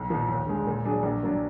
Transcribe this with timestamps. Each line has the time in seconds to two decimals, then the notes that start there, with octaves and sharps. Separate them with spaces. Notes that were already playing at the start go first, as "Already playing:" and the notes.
Already playing: B1
0.10 A#2 F3
0.28 D#2
0.46 D3 G#3
0.66 A#2
0.85 F#3 D4 G#4
1.03 A#1
1.23 A#2 F#3 D4